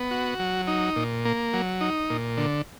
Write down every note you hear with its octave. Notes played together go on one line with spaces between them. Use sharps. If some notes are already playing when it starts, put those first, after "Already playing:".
Already playing: B3
F#4
F#3
D#4
A#2
A#3
F#3
D#4
A#2
D3